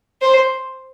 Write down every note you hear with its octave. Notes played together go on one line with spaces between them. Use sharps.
C5